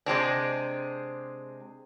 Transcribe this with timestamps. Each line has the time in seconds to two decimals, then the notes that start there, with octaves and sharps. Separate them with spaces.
0.06 C3 G#3 C4 D4